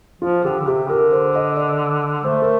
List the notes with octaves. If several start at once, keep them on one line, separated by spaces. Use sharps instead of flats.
F3 F4
D3 G4
D3
C3 G4
D3 A#4
C5
D#5
D5
A3 C5
A#4